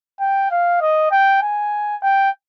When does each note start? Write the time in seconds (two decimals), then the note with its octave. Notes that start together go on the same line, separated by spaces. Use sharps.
0.20 G5
0.51 F5
0.81 D#5
1.11 G5
1.42 G#5
2.03 G5